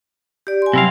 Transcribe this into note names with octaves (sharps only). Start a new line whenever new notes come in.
G4 D5
G#5 C6
C3 F#3 G3 E4 F5 C6